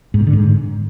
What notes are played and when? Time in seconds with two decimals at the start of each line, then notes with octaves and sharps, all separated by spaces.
0.14 G#2
0.20 B2
0.27 D3
0.33 G#2